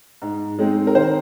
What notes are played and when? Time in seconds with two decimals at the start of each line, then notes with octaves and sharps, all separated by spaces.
0.22 G#2
0.59 G#3 C4 D#4
0.87 A#4
0.95 D#3 C5